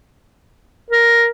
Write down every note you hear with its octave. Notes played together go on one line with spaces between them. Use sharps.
A#4